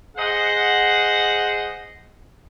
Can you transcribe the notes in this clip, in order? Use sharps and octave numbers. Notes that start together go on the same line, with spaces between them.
G#4 C5 D#5 F#5